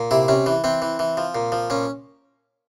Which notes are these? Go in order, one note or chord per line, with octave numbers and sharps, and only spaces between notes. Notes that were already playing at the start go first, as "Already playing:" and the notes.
Already playing: A#2
C3 E4
C3 C#4
E3
E3 C4
E3
E3
F3
A#2
F3
A#2 C#4